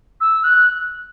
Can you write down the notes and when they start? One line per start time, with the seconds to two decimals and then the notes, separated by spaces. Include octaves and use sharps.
0.21 E6
0.44 F#6